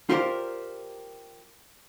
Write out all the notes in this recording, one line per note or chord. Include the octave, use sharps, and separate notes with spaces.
F4 G4 A#4 C5 D5